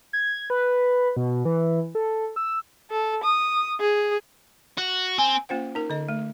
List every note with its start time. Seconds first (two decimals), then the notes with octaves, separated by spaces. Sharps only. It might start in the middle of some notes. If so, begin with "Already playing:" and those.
0.13 G#6
0.50 B4
1.17 B2
1.45 E3
1.95 A4
2.36 E6
2.91 A4
3.23 D#6
3.80 G#4
4.78 F#4
5.18 C4 G#5
5.49 A#3 C#4 F4 C5 F#5
5.75 D#4 A#4
5.90 D3 D#5
6.09 A3